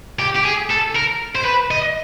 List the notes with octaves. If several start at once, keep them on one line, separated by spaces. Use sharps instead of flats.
G4
G4
G#4
A4
A#4
C5
B4
D#5